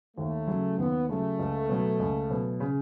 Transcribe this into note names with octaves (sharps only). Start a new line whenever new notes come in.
D#2 A3
C#3 F#3
D#2 B3
C#3 F#3 A3
C#2
B2 F#3
C#2
B2 F#3
C#3